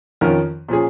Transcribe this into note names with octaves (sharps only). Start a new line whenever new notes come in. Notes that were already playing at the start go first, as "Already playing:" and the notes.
F2 D#3 C#4 F4 A#4
A#2 F3 C#4 G#4